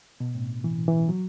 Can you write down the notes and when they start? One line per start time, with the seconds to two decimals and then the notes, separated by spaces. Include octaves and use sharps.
0.20 B2
0.35 A2
0.64 E3
0.88 E3
1.09 F#3